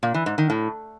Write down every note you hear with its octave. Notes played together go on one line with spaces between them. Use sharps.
A#2
E3
G#2
D#3
A2